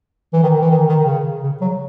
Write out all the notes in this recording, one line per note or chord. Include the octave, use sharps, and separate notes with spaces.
E3
D#3
E3
D#3
D#3
C#3
C#3
F#3